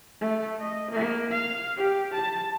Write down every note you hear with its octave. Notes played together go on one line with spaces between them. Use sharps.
A3
D#5
A#3
F5
G4
A5